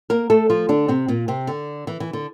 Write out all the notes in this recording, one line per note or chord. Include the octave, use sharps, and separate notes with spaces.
A#3 A#4
A3 A4
F3 F4
D3 D4
C3 C4
A#2 A#3
C3 C4
D3
E3
E3
D3